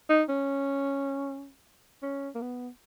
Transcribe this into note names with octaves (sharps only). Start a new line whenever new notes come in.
D#4
C#4
C#4
A#3
B3